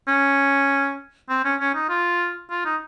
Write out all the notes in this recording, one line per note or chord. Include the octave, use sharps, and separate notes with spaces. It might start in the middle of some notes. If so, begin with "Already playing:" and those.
C#4
C4
C#4
C#4
D#4
F4
F4
D#4